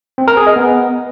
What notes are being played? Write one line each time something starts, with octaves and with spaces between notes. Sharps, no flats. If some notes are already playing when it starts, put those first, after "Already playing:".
C4
A#4
G#4
D#5
B3